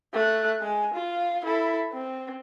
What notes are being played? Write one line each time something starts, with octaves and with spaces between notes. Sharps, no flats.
A3 F#6
G#3 G#5
F4 F5
E4 A4
C4